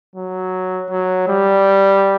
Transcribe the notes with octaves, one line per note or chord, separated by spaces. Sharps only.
F#3
F#3
G3